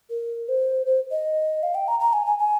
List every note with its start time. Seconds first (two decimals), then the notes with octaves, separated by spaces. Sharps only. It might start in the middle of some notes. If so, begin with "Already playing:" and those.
0.10 A#4
0.49 C5
0.86 C5
1.11 D#5
1.63 F5
1.75 G5
1.88 A#5
2.00 A#5
2.13 G#5
2.26 G#5
2.39 G#5